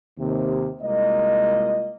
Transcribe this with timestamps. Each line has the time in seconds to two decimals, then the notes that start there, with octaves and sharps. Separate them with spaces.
0.19 D#2 C3
0.82 C2 G#3 A#3 F4 D#5